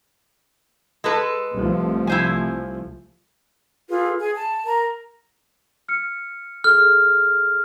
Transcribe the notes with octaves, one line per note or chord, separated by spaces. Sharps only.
G#3 A4 B4
C2 F3 A3
E4 C5 G#5
F4 G#4 A4 B4
G#4 G#5
A5
A#4 A#5
F6 C#7
G#4 A4 F6